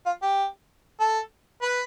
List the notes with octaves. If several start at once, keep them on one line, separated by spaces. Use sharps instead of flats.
F4
G4
A4
B4